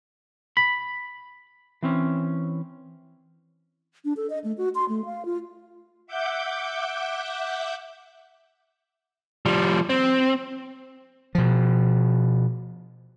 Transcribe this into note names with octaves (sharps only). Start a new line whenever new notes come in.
B5 B6
E3 C4 C#4
D4
A4
D#5
A3
F#4
C6
A3
F5
F4
E5 F#5 D6 G6
F3 G3
C4
B2 F3